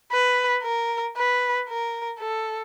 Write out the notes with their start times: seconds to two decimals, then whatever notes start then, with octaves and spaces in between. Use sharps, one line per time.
0.12 B4
0.63 A#4
1.16 B4
1.68 A#4
2.20 A4